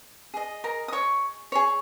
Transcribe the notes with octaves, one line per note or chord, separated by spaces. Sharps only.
G#4 D#5
A#4 A#5
D#6
C#5 C#6
G#4 C#5